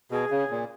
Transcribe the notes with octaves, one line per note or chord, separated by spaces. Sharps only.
B2 G#4
C#3
A#2